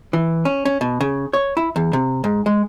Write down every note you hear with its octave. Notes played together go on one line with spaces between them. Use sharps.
E3
C#4
C#4
B2
C#3
C#5
E4
E2
C3
G#2
G#3